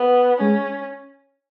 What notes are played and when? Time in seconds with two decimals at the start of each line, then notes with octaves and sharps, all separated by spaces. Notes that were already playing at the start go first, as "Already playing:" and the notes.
Already playing: B3
0.41 G#3 C#4